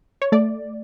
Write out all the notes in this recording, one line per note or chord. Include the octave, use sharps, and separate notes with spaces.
C#5
A3 D5